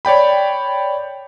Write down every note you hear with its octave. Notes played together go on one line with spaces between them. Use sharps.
C#5 D5 G5 B5